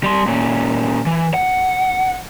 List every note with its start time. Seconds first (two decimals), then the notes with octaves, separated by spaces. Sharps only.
0.03 G3 C6
0.27 A#2 C#4
1.06 E3
1.34 F#5